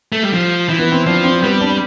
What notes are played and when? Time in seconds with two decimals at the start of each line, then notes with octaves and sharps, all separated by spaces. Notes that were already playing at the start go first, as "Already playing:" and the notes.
0.12 A3
0.23 G3
0.33 F3
0.69 E3
0.79 B3
0.92 C4
1.06 F3 D4
1.24 C4
1.42 G3 B3
1.61 D4